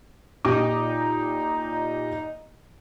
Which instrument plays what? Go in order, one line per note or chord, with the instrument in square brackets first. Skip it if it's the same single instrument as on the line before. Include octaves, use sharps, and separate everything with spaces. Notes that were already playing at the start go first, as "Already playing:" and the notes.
[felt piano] A#2 G4 D6 [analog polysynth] D#4